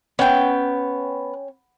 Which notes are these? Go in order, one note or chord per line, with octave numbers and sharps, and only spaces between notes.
B3 C#4 G5